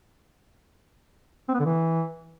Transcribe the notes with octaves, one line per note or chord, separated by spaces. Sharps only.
C4
B3
D3
E3